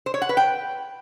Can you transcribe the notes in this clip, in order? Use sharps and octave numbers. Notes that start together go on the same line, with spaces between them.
C5
C#5
F#5
B4
G5